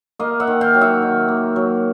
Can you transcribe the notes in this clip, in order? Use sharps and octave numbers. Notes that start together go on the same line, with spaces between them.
A#3 D#5 F5
E5 F#5
D#3
F5 G5
F#3
E5 F#5
D#3
A#3
F#3